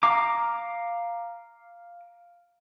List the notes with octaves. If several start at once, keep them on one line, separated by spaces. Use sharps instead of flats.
F5 A#5 D6